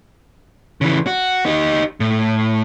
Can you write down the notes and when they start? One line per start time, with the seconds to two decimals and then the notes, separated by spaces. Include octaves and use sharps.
0.81 C#3 E3
1.07 F#4
1.46 D#4 G4
2.00 A2